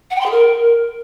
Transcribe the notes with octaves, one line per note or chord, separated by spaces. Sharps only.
F#5
G5
C6
G#4
A#4